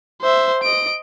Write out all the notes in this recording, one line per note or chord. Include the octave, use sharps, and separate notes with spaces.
C5 E5
D#5 D7